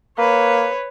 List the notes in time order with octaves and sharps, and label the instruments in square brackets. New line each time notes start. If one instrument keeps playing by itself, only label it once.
[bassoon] A#3 [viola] B4 C#5